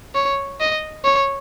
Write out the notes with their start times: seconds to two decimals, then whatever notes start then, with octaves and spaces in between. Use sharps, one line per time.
0.15 C#5
0.60 D#5
1.04 C#5